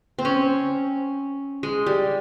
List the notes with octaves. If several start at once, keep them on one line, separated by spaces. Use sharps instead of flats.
C4
C#4
G#3
G3